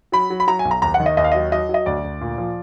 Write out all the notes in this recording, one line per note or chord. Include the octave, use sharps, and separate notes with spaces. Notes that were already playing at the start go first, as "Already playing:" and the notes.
F#3 B5
F#3
B5
F#3 A#5
G#5
B1
A#5
D#2 A#5
F#5
D#3
D#5
D#2 D#5
F5
F#3 D#5
F#3 D#5
F#3
D#5
D2 D5
D2
A#2
F3